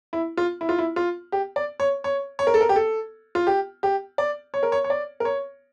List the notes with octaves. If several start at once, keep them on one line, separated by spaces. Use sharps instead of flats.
E4
F4
E4
F4
E4
F4
G4
D5
C#5
C#5
C#5
A#4
A4
A#4
G4
A4
F4
G4
G4
D5
C#5
A#4
C#5
C#5
D5
A#4
C#5